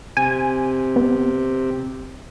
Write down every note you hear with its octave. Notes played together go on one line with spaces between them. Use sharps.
C3 G#5
B3